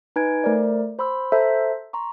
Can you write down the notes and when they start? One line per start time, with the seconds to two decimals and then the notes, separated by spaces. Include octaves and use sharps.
0.16 D#4 B4 G#5 G#6 D7
0.44 A3 A#4 C5 D5
0.99 C5 B5 C6 E6
1.32 A4 C5 E5 A#5
1.93 A#5 C6 C#6